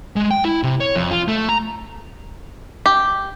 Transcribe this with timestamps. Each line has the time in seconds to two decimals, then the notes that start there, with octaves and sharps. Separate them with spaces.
0.16 G#3
0.31 G5
0.45 E4
0.63 C3
0.80 C#5
0.96 F2
1.11 F4
1.28 A3
1.49 A#5
2.86 G4